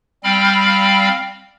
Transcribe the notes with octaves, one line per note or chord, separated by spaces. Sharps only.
G3 C4 F5 G5 B5 F6